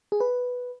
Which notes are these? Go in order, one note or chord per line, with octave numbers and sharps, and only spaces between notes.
G#4
B4